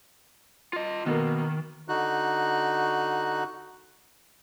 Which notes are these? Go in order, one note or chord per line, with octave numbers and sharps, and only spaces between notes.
F4 D#5
B2 D#3 A#3
D3 D#4 F#4 F#6